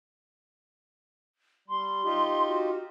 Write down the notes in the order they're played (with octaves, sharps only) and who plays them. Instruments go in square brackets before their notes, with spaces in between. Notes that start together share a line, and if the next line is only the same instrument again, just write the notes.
[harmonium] G3 [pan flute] C6
[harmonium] D#4 F4 G4
[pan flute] F#4